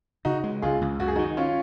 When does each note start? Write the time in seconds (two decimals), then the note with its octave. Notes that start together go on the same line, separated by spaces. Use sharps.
0.25 C#3 D#4 F#4
0.44 G#3
0.62 C#2 F4 G#4
0.81 C#2
0.99 F#2 F#4
1.08 G#4
1.16 D#4 F#4
1.19 D#3
1.37 C#4 F4